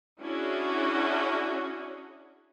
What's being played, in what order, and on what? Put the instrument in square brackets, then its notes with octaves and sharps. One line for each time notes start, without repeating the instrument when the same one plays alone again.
[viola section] C#4 D4 E4 F#4 G#4